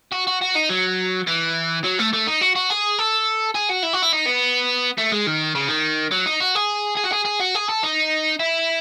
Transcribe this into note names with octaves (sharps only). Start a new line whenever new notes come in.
F#4
F#4
F#4
D#4
F#3
E3
F#3
A3
A3
D#4
F#4
F#4
G#4
A4
G#4
F#4
E4
F#4
E4
D#4
B3
A3
G#3
D#3
C#3
D#3
F#3
D#4
F#4
G#4
G#4
F#4
G#4
G#4
F#4
G#4
A4
D#4
E4